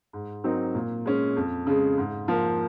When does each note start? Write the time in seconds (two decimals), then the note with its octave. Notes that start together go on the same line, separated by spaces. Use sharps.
0.13 G#2
0.44 F#3 C4 D#4 A#4
0.75 A#2
1.06 G#3 C#4
1.36 F2
1.67 C#3 G#3
1.98 G#2
2.28 F3 A#3